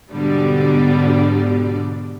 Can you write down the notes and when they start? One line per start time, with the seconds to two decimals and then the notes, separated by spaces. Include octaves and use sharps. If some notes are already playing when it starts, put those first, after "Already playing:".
0.11 G#2 B2 D3 G3 D5